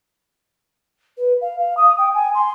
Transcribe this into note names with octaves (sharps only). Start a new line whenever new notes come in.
B4
F5
F5
D#6
G5
G#5
C6